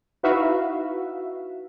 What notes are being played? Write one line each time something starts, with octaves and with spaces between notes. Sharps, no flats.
D#4 E4 F#4 B4 E5 F5